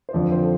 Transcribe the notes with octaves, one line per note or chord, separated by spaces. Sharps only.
C5
F2 D3 F3 D5
C5
A4